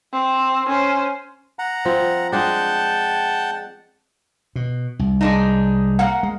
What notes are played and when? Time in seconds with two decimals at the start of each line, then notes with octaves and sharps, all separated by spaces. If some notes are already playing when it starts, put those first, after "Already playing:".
0.13 C4
0.68 C#4 C5
1.59 F#5 A#5
1.85 F3 C4
2.32 G#3 D4 F#5 G5 A5
4.56 B2
4.99 C2
5.21 G#3 D4 D#4
5.99 A#3 F#5
6.23 G#3